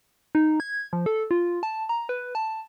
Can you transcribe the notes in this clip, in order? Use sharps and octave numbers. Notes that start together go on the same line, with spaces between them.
D#4
G#6
F3
A4
F4
A5
A#5
B4
A5